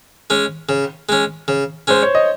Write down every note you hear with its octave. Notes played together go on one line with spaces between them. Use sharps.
G#3 C#4
C#3
G#3 C#4
C#3
G#3 C#4 C5
C#5
D#5